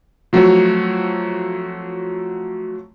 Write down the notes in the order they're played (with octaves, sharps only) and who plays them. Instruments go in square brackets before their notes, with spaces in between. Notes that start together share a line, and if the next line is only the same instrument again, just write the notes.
[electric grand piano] F3 F#3 A3 C4 F#4 C#5